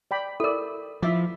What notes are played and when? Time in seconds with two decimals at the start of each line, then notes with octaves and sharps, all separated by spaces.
0.11 D5 G5 B5
0.40 E4 A4 A#4 D5
1.02 F3 E4 E5 D6